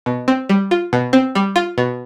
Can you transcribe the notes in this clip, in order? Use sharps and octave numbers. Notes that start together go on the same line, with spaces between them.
B2
C4
G3
F4
B2
C4
G3
F4
B2